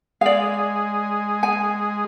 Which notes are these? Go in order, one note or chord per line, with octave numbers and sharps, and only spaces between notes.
G#3 G#4 D5 F5
G#5